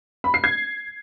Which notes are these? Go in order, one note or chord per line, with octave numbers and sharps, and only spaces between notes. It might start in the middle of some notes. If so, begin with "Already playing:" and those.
B5
C7
G#6